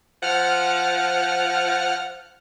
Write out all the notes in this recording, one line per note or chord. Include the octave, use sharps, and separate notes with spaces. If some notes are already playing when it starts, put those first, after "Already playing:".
F3 F#5 F6